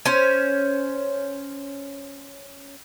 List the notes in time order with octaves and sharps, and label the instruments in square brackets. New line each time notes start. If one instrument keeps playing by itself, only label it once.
[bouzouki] C#4 C5